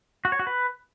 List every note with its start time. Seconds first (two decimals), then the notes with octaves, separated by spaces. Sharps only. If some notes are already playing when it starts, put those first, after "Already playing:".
0.25 F#4
0.32 C#5
0.39 F#4
0.47 B4